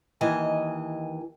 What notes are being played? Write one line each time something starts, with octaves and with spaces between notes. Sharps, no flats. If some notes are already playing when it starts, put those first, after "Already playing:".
D#2 E3 D#5 G#5